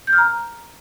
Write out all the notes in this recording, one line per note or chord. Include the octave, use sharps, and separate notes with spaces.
G6
F6
A#5